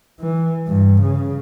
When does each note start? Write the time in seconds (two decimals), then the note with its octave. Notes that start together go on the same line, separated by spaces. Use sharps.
0.20 E3
0.68 G2
1.02 C#3